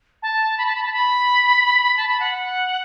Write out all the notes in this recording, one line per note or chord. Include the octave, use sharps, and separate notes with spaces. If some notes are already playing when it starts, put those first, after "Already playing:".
A5
B5
A5
B5
A5
B5
A5
B5
F#5